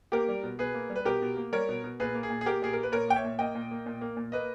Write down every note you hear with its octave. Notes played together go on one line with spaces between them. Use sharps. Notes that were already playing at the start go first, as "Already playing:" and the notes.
A#3 G4 A#4
G3
B2
B2 G#4 B4
A#3
G3
B4
B2 G4 A#4
B2
A#3
G3 A#4 C#5
B2
B2
A#2 G#4 B4
A#3
G#4
A#2
G#4
A#3 G4 A#4
A#2 G#4
A#3 A#4
B4
A#2 A#4 C#5
A#3 G5
C#5 E5
A#2
A#3 D#5 G5
A#2
A#3
A#2
A#3
A#2
A#3 B4 D#5